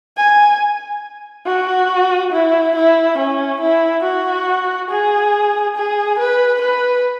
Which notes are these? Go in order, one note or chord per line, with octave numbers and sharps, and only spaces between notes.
G#5
F#4
E4
E4
C#4
E4
F#4
G#4
G#4
B4
B4